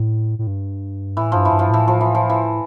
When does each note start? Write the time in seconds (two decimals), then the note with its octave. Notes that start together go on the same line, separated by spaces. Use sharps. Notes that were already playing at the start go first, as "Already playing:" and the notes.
Already playing: A2
0.39 A2
0.47 G2
1.17 A2 E3
1.32 G2 F3
1.45 E3
1.52 G2
1.59 F3
1.70 A2 E3
1.88 F3
2.01 E3
2.15 F3
2.29 E3